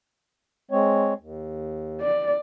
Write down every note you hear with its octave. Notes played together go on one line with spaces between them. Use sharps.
G#3 C4 C#5
D#2
D5